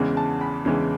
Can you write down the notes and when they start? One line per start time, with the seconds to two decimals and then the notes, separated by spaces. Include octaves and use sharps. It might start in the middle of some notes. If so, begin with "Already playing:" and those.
Already playing: E2 C#3 E3 G#3
0.17 A5
0.41 B5
0.65 E2 C#3 E3 G#3